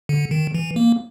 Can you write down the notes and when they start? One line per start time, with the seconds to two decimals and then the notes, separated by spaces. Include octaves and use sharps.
0.09 D3
0.31 D#3
0.54 E3
0.76 A#3